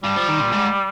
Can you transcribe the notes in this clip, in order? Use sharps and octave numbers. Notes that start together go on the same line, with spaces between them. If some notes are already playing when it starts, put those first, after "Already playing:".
G2 G3
F3
D#3
A#2
G#2